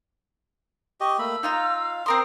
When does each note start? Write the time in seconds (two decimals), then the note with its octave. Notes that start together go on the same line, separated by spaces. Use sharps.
1.01 G4 D#5 C#6
1.19 A3 A#3 B5 E6
1.43 D#4 F4 F5 A#5
2.06 C4 A#4 C6 D#6